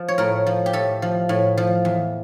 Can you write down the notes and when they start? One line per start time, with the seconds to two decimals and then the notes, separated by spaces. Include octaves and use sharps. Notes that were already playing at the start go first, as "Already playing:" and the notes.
Already playing: F3
0.08 C#5
0.18 A2 A#4
0.46 F3
0.66 G4
0.73 A2 A4
1.02 F3
1.29 A2
1.57 F3
1.85 E2